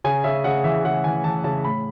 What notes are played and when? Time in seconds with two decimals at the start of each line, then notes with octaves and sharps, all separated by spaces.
0.04 C#3 G#5
0.24 C#3 E5
0.44 C#3 F#5
0.64 E3 E5
0.84 C#3 F#5
1.04 E3 G#5
1.24 E3 A5
1.44 C#3 A5
1.64 A2 B5